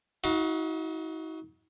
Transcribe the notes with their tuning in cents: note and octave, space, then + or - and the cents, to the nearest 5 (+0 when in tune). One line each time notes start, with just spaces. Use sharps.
D#4 +45 F#4 +0 F5 +35